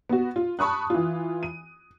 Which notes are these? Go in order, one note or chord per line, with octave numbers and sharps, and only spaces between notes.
B3 F#4
F4
A5 B5 C#6 D#6 F#6
E3 F4
D#7